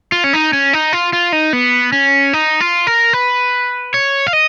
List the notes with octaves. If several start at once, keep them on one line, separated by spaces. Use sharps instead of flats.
F4
C#4
D#4
C#4
D#4
F4
F4
D#4
B3
C#4
D#4
F4
A#4
B4
C#5
F5
D#5